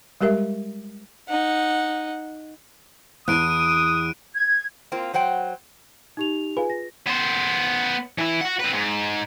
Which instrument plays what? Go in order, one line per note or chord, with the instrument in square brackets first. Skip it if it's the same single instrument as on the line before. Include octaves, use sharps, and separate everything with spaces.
[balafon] G3 G#3 G4 A#4 E5
[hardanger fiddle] D#4 F#5
[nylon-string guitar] E2 [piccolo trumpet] D#6 [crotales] F#6 D7 D#7
[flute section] G#6
[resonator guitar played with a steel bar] A#3 C4 F4
F#3 C5 F#5 G5
[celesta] D#4 G4 F7
[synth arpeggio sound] F4 G#4 B4 [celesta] G#5
[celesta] A#6
[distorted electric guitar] B3 C5
E3 E4
F#4 F#5
C4 B4
G#2